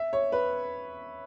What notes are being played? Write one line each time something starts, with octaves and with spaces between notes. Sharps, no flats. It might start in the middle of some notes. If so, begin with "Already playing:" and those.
Already playing: E5
C#5
B4